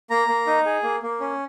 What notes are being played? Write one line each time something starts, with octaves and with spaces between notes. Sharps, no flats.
A#3 A#5
A#3
D#4
G#4
A#3
A#3
C#4